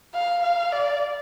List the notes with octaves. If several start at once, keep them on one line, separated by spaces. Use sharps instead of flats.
F5
F5
D5